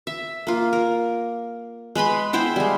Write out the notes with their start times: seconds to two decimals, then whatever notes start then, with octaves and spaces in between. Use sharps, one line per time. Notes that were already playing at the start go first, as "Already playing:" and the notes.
0.07 E5
0.47 A#3 F4
0.73 A#4
1.95 G#3 B4 B5 C6
2.33 B3 E4 C5 G5
2.56 G3 G#3